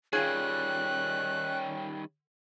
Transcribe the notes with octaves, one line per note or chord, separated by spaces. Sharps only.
D#3 G3 C#4 F4 G#4 F#6